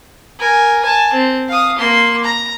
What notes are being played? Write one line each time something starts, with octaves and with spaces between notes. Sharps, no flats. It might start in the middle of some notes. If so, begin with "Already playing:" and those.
A#4 G#5
G#5 A5
C4
F5 D#6
A#3 C6
A#5